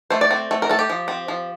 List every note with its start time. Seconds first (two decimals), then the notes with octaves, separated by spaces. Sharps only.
0.10 A3 C5
0.21 D5
0.31 C4
0.51 A3
0.62 A#4
0.69 A3 A4
0.79 G4
0.90 F3
1.08 C4
1.28 F3